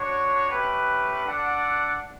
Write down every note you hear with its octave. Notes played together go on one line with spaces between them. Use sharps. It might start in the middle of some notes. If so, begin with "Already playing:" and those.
Already playing: D4 F#4 C#5
A3 C#4 G4 B4
D4 A4 D5 F#5